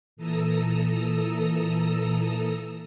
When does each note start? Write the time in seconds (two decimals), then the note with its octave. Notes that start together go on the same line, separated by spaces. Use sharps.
0.16 A#2 E3 A4 A#5 D#6 E6